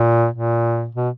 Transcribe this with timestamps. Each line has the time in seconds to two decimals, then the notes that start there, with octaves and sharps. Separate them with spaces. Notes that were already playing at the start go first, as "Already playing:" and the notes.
Already playing: A#2
0.34 A#2
0.95 B2